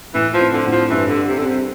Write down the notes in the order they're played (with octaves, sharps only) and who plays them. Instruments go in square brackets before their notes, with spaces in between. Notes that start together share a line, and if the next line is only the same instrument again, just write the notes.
[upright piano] A2 [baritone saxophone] E3
[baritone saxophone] F3
[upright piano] C4
[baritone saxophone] D3
[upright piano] A2
[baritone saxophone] F3
[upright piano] G2 [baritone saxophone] E3
[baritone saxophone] D3
[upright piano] G3
[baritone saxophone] C3
[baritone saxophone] D3 [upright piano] C4
[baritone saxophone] C3